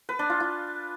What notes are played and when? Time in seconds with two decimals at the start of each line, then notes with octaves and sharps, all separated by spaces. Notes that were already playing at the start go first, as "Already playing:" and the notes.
0.09 B4
0.19 D4
0.30 F4
0.40 F4